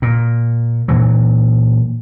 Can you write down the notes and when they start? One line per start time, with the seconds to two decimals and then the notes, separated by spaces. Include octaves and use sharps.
0.02 A#2
0.88 A#2 E3 F#3